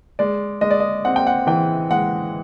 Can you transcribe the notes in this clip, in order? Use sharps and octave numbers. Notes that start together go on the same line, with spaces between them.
G#3 D5
G#3 D#5
D5
D#5
C4 F#5
G5
F#5
E3 G5
G#3 F#5